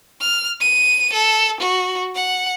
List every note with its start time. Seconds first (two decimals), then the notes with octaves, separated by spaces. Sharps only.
0.21 F6
0.61 D#7
1.13 A4
1.61 F#4
2.15 F#5